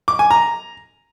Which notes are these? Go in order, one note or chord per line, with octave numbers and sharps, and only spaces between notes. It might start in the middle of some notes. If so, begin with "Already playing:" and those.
D6
G#5
A#5